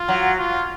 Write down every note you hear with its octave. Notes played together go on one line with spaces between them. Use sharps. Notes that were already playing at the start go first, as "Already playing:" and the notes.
Already playing: F4
F#3
F4